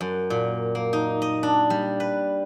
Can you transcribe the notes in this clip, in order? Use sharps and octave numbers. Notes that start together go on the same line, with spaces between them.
F#2
A#2
A#3
D#4
D#5
D4
G3
B4